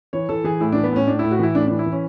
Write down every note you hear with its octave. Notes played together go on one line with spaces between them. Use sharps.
E3 C#5
E3 A4
E3 G#4
A2 E4
E3 D4
B3
A2 C#4
A2 D4
A2 E4
F#4
E3 E4
A2 D4
E3 D4
E4
E3
C#4